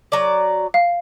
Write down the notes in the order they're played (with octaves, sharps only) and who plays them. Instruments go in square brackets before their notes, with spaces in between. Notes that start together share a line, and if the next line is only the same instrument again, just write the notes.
[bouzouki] F#3 D5
[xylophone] F5